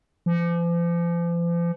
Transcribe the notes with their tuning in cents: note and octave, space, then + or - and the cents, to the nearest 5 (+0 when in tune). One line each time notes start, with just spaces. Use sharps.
F3 -40